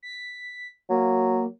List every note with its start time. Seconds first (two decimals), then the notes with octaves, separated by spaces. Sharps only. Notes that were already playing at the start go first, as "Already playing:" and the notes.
0.03 B6
0.90 F#3 A#3